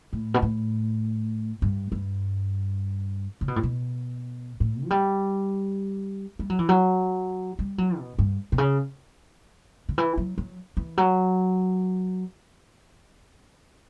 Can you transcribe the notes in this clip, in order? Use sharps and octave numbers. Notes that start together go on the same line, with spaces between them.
A2
B2
A2
G2
G2
C#3
B2
A2
B2
A2
F#3
G3
G3
F#3
E3
F#3
G3
F#3
B2
G2
B2
C#3
D3
E3
F#3
F#3
E3
F#3